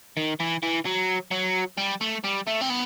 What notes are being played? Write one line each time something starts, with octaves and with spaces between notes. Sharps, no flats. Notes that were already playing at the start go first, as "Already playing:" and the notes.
D#3
E3
E3
F#3
F#3
G3
A3
G3
A3
C4
B3